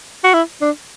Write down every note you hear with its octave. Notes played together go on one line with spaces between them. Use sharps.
F#4
E4
D4